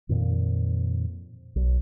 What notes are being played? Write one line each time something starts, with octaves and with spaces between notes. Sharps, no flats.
F2 A#2 D#3
B1